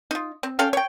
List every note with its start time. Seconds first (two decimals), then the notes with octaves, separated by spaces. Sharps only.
0.11 D#4 F4
0.43 C4
0.59 C#4 A4 F5 G5
0.73 C#5 G5